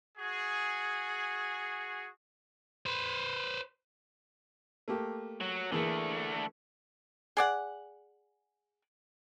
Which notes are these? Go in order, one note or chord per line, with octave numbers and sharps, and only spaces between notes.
F#4 G#4
B4 C5
A3 A#3 G4
F#3
D3 E3 A3 A#3 G#4
G#4 D5 F#5